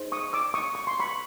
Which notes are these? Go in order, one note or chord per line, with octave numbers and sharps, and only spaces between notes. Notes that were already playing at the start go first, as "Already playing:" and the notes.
Already playing: D#4 G#4 C5
C#6 D#6
D6 E6
C#6 D#6
C#6
C6
B5 C#6